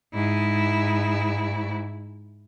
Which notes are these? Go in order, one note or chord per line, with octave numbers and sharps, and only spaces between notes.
G#2 E4